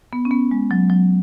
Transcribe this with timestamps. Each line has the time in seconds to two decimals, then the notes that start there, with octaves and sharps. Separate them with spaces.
0.13 B3
0.25 C#4
0.31 B3
0.51 G#3
0.71 F#3
0.90 F#3